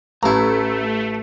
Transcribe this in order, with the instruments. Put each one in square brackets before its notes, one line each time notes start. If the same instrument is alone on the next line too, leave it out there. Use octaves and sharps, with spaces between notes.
[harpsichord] A1 E4 [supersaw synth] A3 [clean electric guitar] C#4 A#5